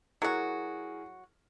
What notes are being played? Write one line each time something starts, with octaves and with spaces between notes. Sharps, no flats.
F#3 E4 F#4 G#4 A#4